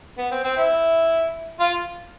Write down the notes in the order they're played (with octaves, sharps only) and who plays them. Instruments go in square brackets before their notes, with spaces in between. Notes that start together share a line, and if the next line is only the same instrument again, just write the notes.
[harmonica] B3
C4
C4
E4
F4